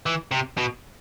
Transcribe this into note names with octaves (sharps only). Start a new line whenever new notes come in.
E3
C3
B2